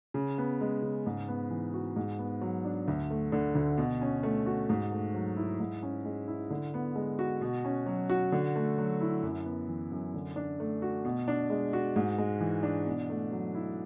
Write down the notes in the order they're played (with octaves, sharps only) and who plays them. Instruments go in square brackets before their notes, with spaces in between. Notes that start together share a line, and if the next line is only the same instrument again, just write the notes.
[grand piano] C#3
B3
G#3
C#3
G#2
B3
E3
F#4
G#2
B3
F#3
D4
D2
A3
D3
D2
B2
C#4
A3
F#4
G#2
A3
F#3
E4
G#2
C#4
G#3
E4
D3
B3
G#3
F#4
B2
C#4
F#3
F#4
D3
A3
F#3
E4
F#2
B3
E3
F#2
D3
D4
A3
F#4
B2
D4
G#3
F#4
G#2
G#3
E3
D4
B2
A3
F#3
E4